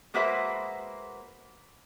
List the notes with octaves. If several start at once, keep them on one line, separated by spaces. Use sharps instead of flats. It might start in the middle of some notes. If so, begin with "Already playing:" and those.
G#3 A#3 F#4 B4 C5 E5